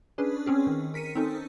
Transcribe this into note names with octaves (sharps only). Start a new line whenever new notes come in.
C#4 D4 G#4 B4
C4 C#4 G#4
D#3
A#4 B6 C#7 D#7
C4 C#4 D#4 A4